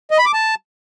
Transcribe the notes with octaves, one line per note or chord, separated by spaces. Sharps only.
D#5
B5
D6
A5